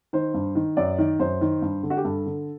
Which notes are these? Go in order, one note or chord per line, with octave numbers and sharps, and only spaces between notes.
D#3 C5
G2
D#3
F#2 D5
D#3
F#2 C5
D#3
G2
D3
F#4
G4
G2 A4
D3